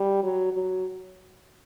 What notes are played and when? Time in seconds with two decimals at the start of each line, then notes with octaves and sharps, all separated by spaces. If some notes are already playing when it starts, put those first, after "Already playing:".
Already playing: G3
0.23 F#3
0.53 F#3